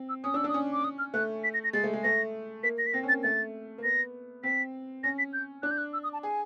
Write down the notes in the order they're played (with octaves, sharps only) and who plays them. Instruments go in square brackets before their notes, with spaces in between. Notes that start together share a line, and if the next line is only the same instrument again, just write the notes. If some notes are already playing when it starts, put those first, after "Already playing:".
Already playing: [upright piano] C4
[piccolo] E6
[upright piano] C#4 [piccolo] D#6
[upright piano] D4 [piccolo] E6
[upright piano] D4
[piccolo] D#6
[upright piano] C#4
[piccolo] D6
D#6
F6
[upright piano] A3 [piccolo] F#6
[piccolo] B6
A#6
A#6
[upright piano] G#3 [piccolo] A6
[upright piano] A3
G#3
[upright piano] A3 [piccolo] A#6
[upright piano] A#3 [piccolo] B6
[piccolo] A#6
B6
[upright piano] C4 [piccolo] A#6
[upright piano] C#4
[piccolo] A6
[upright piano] A#3
[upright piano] A3 [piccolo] A6
[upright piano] A#3
[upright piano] B3 [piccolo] A#6
[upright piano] C4 [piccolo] B6
[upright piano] C#4 [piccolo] A#6
[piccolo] B6
G6
[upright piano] D4 [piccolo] F#6
[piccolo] G6
F#6
E6
D#6
A5
[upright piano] G#4 [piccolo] G#5